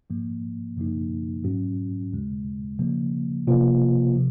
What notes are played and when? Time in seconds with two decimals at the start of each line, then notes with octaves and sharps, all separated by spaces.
0.10 G#2 F3 A#3
0.77 F#2 C#3 F3 A#3 D#4
1.44 G#2 F#3 C#4 F#4
2.12 D#2 C#3 G#3
2.79 C#3 F3 A#3
3.47 C3 F3 A#3 F4 C5
4.15 C3 F3